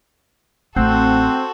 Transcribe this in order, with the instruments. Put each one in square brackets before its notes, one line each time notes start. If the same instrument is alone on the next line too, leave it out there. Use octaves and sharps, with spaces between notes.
[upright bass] A1 A3 [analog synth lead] C4 [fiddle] F#4 A4 [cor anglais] F#5